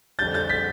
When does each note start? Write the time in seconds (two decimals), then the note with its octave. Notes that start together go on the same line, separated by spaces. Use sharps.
0.19 F2 D3 G3 G6 A6
0.34 G6 A6
0.49 A6 B6